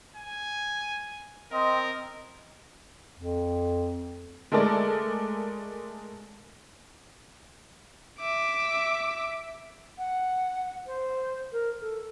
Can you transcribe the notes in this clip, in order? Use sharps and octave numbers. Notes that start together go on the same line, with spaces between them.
G#5
C4 A#4 D#5
F2
G#3 A3 A4 A#4 D5
E5 D6
F#5
C5
A#4
A4